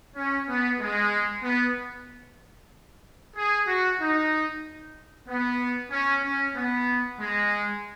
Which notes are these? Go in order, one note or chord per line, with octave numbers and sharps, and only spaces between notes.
C#4
B3
G#3
B3
G#4
F#4
D#4
B3
C#4
C#4
B3
G#3